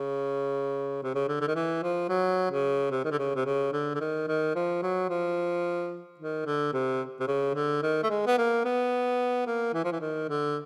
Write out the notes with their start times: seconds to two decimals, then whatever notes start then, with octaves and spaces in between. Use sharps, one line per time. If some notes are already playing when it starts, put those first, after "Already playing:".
Already playing: C#3
1.03 C3
1.15 C#3
1.28 D3
1.41 D3
1.47 D#3
1.55 E3
1.83 F3
2.09 F#3
2.51 C#3
2.91 C3
3.04 D#3
3.11 D3
3.19 C#3
3.35 C3
3.46 C#3
3.73 D3
3.95 D3
4.00 D#3
4.27 D#3
4.55 F3
4.83 F#3
5.09 F3
6.19 D#3
6.46 D3
6.73 C3
7.20 C3
7.28 C#3
7.55 D3
7.83 D#3
8.03 A3
8.10 G#3
8.27 B3
8.38 A#3
8.65 B3
9.47 A#3
9.74 E3
9.84 F3
9.92 E3
10.00 D#3
10.29 D3